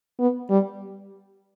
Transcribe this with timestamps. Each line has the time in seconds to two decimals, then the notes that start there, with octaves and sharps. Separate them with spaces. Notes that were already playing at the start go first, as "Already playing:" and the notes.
0.20 B3
0.50 G3